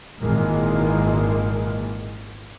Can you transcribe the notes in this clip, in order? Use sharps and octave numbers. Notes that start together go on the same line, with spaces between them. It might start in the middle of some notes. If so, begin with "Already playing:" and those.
G#1 A#2 D#3 E3 G#3 A#3